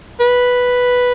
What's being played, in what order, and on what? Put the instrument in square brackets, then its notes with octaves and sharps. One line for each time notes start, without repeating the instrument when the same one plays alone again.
[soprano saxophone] B4